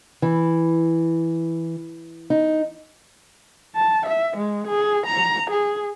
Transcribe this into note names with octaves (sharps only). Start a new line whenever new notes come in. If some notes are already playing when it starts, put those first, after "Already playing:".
E3
D#4
A5
E5
G#3
G#4
A#5
G#4